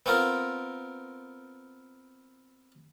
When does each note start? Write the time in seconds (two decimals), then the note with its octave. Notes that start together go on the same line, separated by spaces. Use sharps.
0.06 B3 C4 F4 A#4